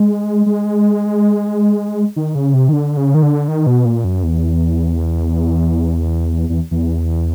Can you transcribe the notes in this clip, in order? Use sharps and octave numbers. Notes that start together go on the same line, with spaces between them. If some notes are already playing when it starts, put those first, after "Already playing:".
Already playing: G#3
G#3
D#3
C#3
C3
D#3
D3
C#3
D#3
D3
D#3
B2
A#2
F#2
E2
E2
E2